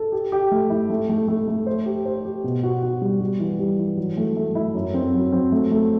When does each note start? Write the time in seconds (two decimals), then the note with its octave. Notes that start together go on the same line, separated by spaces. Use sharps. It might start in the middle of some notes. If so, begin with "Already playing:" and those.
Already playing: A4
0.12 G4
0.32 G4
0.52 A3
0.70 E4
0.90 A3
1.09 A3
1.28 A3
1.47 A3
1.66 C5
1.86 G4
2.06 C5
2.25 G4
2.44 B2
2.63 F#4
2.83 F#4
3.02 G3
3.21 G3
3.40 E3
3.59 G3
3.78 E3
3.97 F#3
4.17 A3
4.37 A3
4.55 E4
4.75 F#2
4.94 C4
5.14 F#3
5.32 C4
5.52 A3
5.71 A3